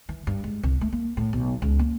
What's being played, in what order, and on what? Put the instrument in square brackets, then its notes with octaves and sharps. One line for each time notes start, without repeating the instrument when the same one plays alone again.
[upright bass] E3
G2
G#2
C2
A3
A#3
A2
B1
C#2
A#3